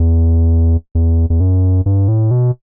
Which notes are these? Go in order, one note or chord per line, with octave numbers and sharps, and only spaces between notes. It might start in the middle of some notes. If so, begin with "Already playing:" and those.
Already playing: E2
E2
E2
F#2
G2
A2
B2